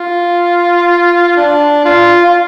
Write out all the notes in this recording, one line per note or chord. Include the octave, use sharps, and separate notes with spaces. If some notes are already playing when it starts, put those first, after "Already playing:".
Already playing: F4
D4
F4
F4